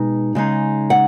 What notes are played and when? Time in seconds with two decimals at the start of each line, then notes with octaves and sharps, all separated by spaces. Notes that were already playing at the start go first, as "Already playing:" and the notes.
Already playing: B2 G#3 D#4
0.35 C#3 G#3 D#4
0.90 F#5